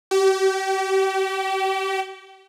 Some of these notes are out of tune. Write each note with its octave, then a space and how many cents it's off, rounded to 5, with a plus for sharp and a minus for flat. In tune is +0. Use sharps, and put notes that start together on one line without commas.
G4 -35